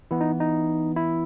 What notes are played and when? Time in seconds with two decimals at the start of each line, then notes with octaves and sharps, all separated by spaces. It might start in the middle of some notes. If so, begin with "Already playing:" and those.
0.11 E3 B3 E4
0.21 D#4
0.40 D#4
0.96 E4